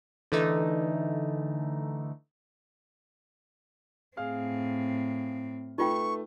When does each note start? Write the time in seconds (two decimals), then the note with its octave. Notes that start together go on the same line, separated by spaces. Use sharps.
0.32 D3 E3 A3 D#4
4.17 A2 C4 G#4 F5 F6
5.78 A3 D#4 F4 B4 G5 C#6